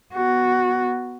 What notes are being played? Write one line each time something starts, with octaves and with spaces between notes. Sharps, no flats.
B3 F#4